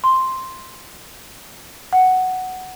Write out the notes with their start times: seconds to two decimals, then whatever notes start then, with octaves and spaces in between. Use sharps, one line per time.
0.04 C6
1.93 F#5